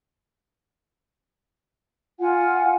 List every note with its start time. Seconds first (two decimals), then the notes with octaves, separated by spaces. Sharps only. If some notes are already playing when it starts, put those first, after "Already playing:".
2.20 F4 F#5 G#5